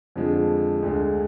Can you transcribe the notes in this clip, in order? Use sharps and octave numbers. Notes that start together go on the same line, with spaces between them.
F2 D3 F3 G#3
D2 D3 G#3